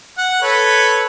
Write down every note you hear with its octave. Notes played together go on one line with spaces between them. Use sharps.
F#5
A4 B4 C#5